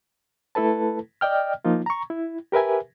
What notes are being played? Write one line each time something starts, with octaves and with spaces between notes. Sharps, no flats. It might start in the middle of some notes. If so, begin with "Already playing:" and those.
A3 E4 A4 B4 A5
D5 D#5 G5 F6
F3 A#3 D#4 F4
A#5 C#6
E4
G4 A#4 B4 E5 G#5